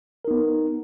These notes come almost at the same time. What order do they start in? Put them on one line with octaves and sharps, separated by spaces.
A#4 D#4 B3